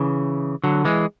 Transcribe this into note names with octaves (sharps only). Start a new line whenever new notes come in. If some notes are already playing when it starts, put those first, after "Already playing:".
Already playing: C#3 E3
D3 F#3
E3 G#3